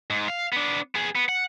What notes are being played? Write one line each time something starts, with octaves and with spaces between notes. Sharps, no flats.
G#2
F5
B3 D4
B3 G#4
B3
F#5